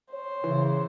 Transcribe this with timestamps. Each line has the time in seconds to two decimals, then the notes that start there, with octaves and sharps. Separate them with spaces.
0.13 C5 C#5
0.44 C#3 E3